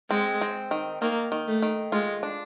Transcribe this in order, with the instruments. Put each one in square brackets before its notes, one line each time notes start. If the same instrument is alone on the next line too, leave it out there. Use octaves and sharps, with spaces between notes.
[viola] G#3 [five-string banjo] C4
[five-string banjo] C4
D#3
[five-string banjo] D#3 [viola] A#3
[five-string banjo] D#3
[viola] A3
[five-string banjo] D#3
[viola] G#3 [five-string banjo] F4
[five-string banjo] D4